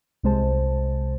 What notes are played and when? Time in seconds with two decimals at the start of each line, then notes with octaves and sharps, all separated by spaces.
0.23 C2 C3 G#3 C5 A5